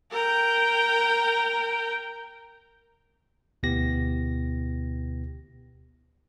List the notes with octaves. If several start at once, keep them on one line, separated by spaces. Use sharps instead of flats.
A#4 G5
D2 B2 B3 E4 G4 A#6